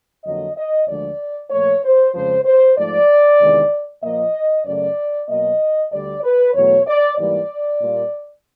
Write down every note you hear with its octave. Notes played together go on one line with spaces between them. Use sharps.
F2 D3 F#3 A#3 D#5
D#5
D2 D3 F3 G#3 D5
A#2 F3 A3 C#5
C5
F2 C#3 F3 G#3 C5
C5
G#2 F3 A3 D5
E2 C3 D#3 G#3
A#2 F3 A#3 D#5
F#2 C#3 F#3 A3 D5
B2 F#3 A#3 D#5
D2 D3 G3 D5
B4
E2 B2 F#3 A3 C#5
D5
G#2 E3 G3 A#3 D5
A#2 G3 A#3